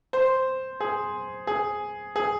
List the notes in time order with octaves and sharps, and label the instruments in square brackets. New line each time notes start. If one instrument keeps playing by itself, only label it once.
[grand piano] C5
G#4
G#4
G#4